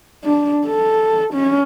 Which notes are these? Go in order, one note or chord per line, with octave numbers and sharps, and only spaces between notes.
D4
A4
C#4